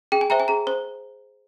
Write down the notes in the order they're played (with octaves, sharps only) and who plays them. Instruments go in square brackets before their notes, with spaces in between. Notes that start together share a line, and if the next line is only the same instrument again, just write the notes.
[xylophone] G#4 G5
G#5
C5 E5 G5 A#5
G#5
G#4 A#5
C5